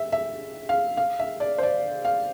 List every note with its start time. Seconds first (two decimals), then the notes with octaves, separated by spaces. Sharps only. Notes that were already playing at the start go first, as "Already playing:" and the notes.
Already playing: E5
0.12 E5
0.69 F5
0.97 F5
1.19 E5
1.40 D5
1.58 C5
1.63 D5
2.05 F5